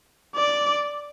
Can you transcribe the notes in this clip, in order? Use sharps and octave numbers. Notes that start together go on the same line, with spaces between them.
D5